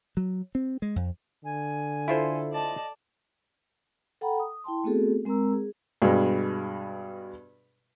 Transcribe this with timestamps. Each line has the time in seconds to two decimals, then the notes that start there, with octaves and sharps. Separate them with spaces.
0.17 F#3
0.55 C4
0.82 G#3
0.96 F2
1.45 D3 G#5
2.08 E4 F4 A4 C5
2.52 D5 D#5 A5
4.21 A4 F#5 G5 A#5 B5
4.39 D#6
4.64 E4 G5 A5 C6
4.84 A3 B3 C4 F#4 G#4 A4
5.25 G#3 C4 A#4 A#5 E6
5.53 G#4
6.02 G2 B2 G#3